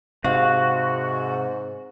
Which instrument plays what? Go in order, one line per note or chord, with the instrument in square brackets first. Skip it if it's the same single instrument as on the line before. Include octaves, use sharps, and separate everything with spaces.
[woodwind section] G#2 [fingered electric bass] C3 [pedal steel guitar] F#4 [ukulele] F5